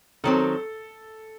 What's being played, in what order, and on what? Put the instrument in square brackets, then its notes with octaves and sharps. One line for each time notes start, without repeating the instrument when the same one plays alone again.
[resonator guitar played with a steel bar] D#3 F#3 C4 [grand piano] A4